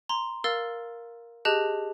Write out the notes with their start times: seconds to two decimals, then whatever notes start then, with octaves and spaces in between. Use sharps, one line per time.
0.09 A#5 C6
0.44 A#4 F5 E6 F6 A6
1.45 G4 G#4 D#5 A5 F#6 G6